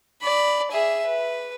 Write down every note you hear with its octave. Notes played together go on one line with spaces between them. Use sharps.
D5 B5
G#4 E5
B4